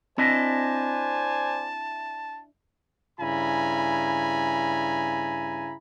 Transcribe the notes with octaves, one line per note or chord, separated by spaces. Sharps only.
C4 D4 E4 C5 D5 D#5 G#5 A5
G2 C#3 E4 G#5 A#5 B5